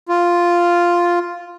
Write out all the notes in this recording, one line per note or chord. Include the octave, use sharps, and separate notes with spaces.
F4